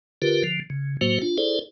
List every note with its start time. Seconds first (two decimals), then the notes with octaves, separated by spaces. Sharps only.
0.22 D3 F4 G4 A#4 B4
0.44 D3 F3
0.70 C#3
1.01 A2 F#3 A#3 F#4 C5
1.22 D4 F4
1.38 E4 G#4 A4 C5 D5